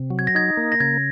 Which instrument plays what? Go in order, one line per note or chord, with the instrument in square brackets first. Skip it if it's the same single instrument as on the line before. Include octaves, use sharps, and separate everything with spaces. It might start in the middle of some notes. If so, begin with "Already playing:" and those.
Already playing: [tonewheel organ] C3
F#3
[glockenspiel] G#6
A#6
[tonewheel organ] D#4 [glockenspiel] G#6
[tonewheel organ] A#3
[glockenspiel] A#6
[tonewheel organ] C#3 [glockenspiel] G#6